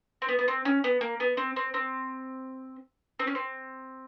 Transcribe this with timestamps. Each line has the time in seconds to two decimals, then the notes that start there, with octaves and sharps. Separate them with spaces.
0.22 C4
0.29 B3
0.39 B3
0.48 C4
0.65 C#4
0.84 B3
1.01 A#3
1.20 B3
1.37 C4
1.56 C4
1.74 C4
3.19 C4
3.27 C#4
3.35 C4